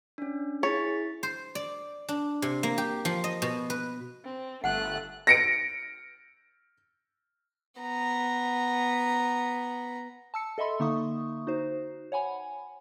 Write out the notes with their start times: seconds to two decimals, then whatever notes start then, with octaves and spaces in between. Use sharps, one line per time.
0.18 C#4 D4
0.63 E4 G#4 C#5 A6 B6
1.23 C5
1.55 D5
2.09 D4
2.42 C3
2.63 A#3
2.78 G4
3.05 F3
3.24 D#5
3.42 B2
3.70 B4
4.25 C4
4.64 G1 A3 F#5 F#6
5.27 A#6 C#7 D7
7.81 B3 A#5
10.34 A5 E6 C#7
10.58 A4 D#5 E5 B5 C6
10.80 D3 A#3 D#4 E5 C#6 D#6
11.47 D#4 F#4 C5
12.12 C#5 F#5 G#5 B5